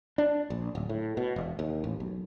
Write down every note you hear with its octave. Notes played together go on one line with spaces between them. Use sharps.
D4
A#1
D1
A2
B2
E1
D#2
A1
B1